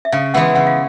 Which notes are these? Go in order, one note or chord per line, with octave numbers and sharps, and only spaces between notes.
E5
C#3 F5
E3 G#3 B3 E4 F#5
C#3 F#5
F5